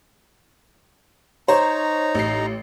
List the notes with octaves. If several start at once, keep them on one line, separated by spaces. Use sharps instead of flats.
D#4 C5 C#5 A#5
A1 C7